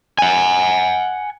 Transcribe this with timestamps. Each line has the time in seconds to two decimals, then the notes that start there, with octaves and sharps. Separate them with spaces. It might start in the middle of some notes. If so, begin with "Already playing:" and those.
0.19 F#5 G#5